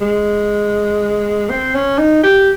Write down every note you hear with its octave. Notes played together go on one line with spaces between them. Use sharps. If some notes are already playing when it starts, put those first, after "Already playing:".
G#3
C4
C#4
D#4
G4